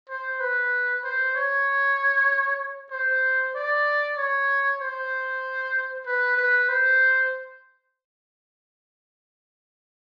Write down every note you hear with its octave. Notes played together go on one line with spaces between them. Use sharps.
C5
B4
C5
C#5
C5
D5
C#5
C5
B4
B4
C5